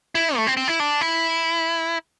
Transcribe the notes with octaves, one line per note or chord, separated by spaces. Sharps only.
E4
A3
C4
C4
E4
D4
E4